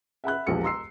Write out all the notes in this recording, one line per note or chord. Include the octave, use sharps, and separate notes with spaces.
E5 F#5 B5 F#6
E1 A#1 G4 C#7
A#5 C6 E6 C7